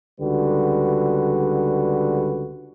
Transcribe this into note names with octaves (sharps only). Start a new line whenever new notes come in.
C#2 D3 G3 F#4 B4